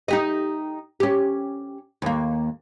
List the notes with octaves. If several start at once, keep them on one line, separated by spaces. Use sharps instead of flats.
D#4 G4 D#5
C#4 G4
D#2 A#3